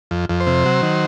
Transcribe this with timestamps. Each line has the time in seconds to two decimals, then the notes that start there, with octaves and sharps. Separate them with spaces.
0.11 F2
0.29 F2
0.40 C5
0.47 C3
0.65 F#3
0.82 D#3